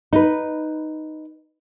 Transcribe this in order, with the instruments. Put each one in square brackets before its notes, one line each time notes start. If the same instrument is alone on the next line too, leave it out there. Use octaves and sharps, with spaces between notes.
[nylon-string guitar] D#4 B4